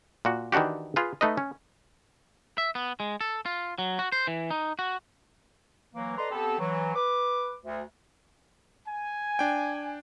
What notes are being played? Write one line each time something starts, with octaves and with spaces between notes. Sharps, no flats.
A#2 F#4
D#3 E3 D4 F#4 G4
F4 G#4 B4
A3 D#4 B4 D#5
C#4
E5
B3
G#3
A4
F4
F#3
F#4
C5
E3
D#4
F#4
E3 F#3 A#3
A4 B4 D5 D#5 A#5 C6
B3 C4 G4 A4
E3 F#3
B4 D6
D2
G#5
D4 G5